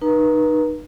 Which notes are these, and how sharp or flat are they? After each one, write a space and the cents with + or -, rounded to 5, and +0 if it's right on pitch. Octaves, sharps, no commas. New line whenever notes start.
D#4 -25 B4 -35 A#5 +0